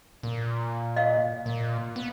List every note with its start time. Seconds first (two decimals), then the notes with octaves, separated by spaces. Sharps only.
0.23 A#2
0.96 D#5 F5
1.46 A#2
1.96 B3